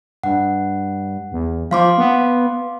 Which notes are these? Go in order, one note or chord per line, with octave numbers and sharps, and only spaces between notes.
G2 F#5
E2
F3 F5 C6 D6
B3